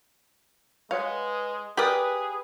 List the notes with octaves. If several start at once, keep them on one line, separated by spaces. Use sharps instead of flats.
G#3 B4 C#5 F5 F#5
G4 G#4 A#4 B4 D5 G5 D#6